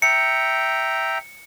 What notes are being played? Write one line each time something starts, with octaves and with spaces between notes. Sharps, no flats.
E5 G5 A#5 C#7